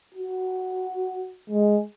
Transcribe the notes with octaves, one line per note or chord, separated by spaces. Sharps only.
F#4
G#3